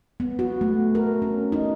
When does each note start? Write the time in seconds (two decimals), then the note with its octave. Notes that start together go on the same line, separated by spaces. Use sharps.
0.20 B3
0.39 F#4
0.61 A3
0.95 A#4
1.22 C#4
1.52 D#4